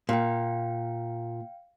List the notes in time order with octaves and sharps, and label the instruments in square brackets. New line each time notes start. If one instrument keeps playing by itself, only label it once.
[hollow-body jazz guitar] A#2 [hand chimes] F5 G5